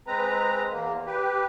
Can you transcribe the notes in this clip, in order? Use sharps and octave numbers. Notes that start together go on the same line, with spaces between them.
G#3 C4 B4 A#5
E2 A#3
G4 B4